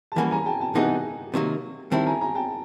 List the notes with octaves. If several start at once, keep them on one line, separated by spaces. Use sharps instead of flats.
A5
E3 G3 A#3 C#4 F#5 G#5
G#5 A#5
G5 A5
G5 A5
C3 E3 G#3 B3 D#4 F#5 G#5
C3 D#3 F#3 A#3
D#3 G3 C4 E4 G5 A5
G#5 A#5
G#5 A#5
G5 A5